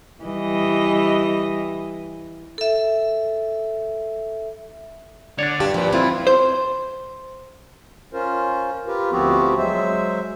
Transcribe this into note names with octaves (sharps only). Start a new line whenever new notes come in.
E3 G3 D#5
A4 E5
D3 D4 C#5 D5
G2 G4 A5
A#2 F3 G3 B4
C4 E4 F4
C5
C#4 F4 A#4 C5
F4 G4 A#4 B4
D2 F3 B3 C4 F#4 G4
F#3 G#3 C5 E5